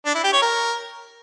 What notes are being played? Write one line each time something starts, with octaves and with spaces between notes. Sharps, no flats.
D4
E4
G4
C#5
A#4